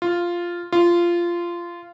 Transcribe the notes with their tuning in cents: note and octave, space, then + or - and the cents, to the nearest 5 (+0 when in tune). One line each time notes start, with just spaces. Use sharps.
F4 -5
F4 -15